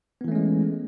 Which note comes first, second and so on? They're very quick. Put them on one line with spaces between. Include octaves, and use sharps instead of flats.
B3 E3 A3 C#4 G#3